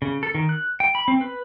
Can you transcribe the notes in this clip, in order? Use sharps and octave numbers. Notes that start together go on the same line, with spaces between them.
C#3
A4
D#3
F#6
G5
B5
C4
B4